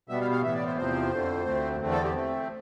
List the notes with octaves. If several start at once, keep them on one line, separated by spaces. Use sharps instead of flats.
B2 G3 B3 E5
F5
F5
A2 E3 B3 E5
D5
C5
E2 C3 F3 C4 C5
F2 D3 A3
D2 D3 A3 C4
E2 D3 A3 C4
A4
G4
A3 C4